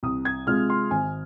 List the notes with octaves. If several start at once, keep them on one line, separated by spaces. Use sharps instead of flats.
C2 D#6
G#6
C3 G#3 F4 F6
C6
G#1 G#5